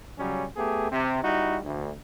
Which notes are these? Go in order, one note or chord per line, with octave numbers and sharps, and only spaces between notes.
C#3 F#3 G3 C#4
A3 B3 G4 G#4
C3
G3 D#4 E4 F#4
D2